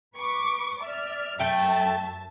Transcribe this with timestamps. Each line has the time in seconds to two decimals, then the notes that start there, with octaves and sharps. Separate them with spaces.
0.16 B4 C#6 D6
0.82 D5 E5 F6
1.40 F#2 A3 E5 G5 A5